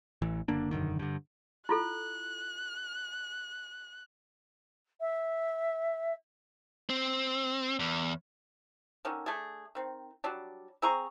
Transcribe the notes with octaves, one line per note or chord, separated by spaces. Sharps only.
A1 E3
F#1 D3 A#3 D4
E1 F#2 D3 D#3
G2 D3
E4 F4 A4 F#6
E5
C4
E2
D3 D#3 C#4
A3 D4 G#4
D#3 C4
F#3 G3 D4
C4 G#4 A#5 C#6